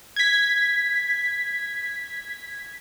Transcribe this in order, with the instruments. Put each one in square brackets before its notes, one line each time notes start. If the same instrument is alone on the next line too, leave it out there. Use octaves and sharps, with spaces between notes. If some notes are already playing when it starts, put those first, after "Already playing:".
[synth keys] G#6 B6